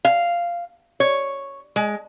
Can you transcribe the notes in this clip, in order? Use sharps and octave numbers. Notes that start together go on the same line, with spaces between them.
F5
C#5
G#3